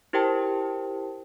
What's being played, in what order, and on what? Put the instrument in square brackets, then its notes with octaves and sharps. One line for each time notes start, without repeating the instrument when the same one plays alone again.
[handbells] E4 G4 A#4 C5 G5 A5